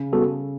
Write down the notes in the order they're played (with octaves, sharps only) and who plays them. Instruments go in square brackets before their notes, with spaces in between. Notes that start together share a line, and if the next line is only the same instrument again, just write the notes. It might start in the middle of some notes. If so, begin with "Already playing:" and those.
Already playing: [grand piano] C#3
[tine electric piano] G3 B3 F#4 A4